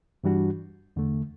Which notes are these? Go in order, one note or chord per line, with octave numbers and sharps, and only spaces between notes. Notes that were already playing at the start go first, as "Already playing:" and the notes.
G2 E3 G3 D4 F#4
E2 D3 A3